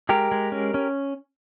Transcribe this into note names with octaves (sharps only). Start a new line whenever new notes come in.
G#3 G4 A#4
G#3
C#4
C#4